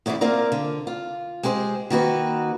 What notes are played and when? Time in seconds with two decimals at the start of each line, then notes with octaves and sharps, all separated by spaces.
0.06 E2 C#3 E4 A4 D5
0.21 A#3 C4 F4 A#4 D5
0.52 D3
0.87 F4
1.43 G#3 G4 G#4 B4 C5
1.90 D#3 A#3 F#4 B4